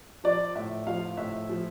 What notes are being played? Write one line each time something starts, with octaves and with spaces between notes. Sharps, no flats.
F3 D5
A2 E5
F3 F5
A2 E5
F3